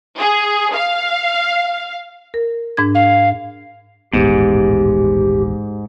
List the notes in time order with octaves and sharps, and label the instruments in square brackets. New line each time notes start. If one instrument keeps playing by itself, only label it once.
[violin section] G#4
F5
[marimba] A#4
G#2 D4 G#6
[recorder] F5
[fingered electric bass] D#1 A1 B3 [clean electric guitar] G#2 [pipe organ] G4